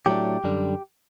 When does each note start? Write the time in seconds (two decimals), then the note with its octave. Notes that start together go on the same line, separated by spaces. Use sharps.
0.06 A2 F#3 A3 D4 G4
0.44 F#2 D3 G3